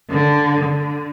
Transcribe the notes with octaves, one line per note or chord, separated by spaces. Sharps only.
D3
D3